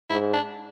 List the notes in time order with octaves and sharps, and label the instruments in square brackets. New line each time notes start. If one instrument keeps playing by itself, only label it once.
[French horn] G#2 [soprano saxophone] E4
[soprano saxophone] D4